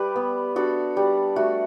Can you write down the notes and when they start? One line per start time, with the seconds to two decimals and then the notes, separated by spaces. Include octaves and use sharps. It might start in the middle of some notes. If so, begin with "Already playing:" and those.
Already playing: G3 G4 B4
0.16 B3
0.56 D4 F#4 A4
0.96 G3 G4
1.36 A3 F#4